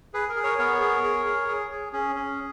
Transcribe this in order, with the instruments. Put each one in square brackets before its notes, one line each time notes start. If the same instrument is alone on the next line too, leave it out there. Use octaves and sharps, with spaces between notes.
[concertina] G#4 B4
A#4
G#4
A#4 C#5
B3 A#4 C#5
G#4
G#4
G#4
G#4
G#4
C#4 G#4
C#4